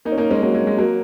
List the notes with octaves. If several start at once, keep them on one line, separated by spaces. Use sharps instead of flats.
A#3 D#4
C#4
A#3 D#4
G#3 C#4
F#3 A#3
G#3
G#3
F#3 A#3